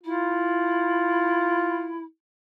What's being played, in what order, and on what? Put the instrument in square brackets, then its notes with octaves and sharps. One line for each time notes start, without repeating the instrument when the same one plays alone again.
[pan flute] E4 [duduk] F4